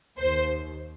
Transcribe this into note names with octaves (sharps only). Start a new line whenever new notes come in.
D#2 C5